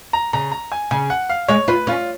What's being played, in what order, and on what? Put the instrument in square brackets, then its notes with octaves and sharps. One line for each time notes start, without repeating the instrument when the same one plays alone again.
[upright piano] A#5
[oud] C#3 [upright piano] A#5
[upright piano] A#5
G#5
[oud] C#3 [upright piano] G#5
[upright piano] F#5
F5
[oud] G#3 [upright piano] C#5
[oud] F4 [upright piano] B4
[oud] C#4 [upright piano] F4